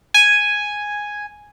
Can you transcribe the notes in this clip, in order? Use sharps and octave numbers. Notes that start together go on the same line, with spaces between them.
G#5